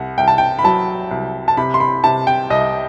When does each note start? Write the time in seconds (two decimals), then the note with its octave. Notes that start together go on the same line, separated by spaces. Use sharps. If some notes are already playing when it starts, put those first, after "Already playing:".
Already playing: C2 F#5
0.18 C2 G5
0.28 A5
0.38 G5
0.59 B5
0.64 F#3 A5
1.11 C2
1.48 A5
1.57 C3 B5
1.74 C6
1.80 B5
2.04 C3 A5
2.27 G5
2.50 C2 D#5